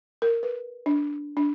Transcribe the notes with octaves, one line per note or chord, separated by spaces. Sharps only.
A#4
B4
D4
D4